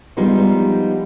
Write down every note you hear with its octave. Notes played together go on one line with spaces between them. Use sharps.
F3 G3 G#3 B3 D#4 F4